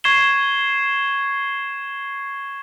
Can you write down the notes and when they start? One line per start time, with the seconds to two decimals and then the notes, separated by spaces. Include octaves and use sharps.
0.04 C#6 G#6 C7 E7 G7